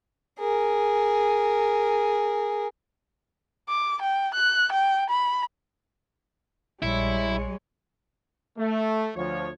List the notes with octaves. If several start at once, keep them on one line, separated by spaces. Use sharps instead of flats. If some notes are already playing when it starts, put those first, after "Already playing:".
G#4 A#4
D6
G5
F#6
G5
B5
A#1 G3 G#3 E4 C#5 C#7
A3
D2 F3 C#5